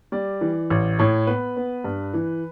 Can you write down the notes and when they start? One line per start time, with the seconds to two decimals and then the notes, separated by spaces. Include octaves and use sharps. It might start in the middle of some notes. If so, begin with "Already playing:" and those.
0.12 G3 D5
0.41 E3
0.70 A1
0.99 A2 C#5
1.27 B3 B4
1.57 B3
1.84 G2
2.14 E3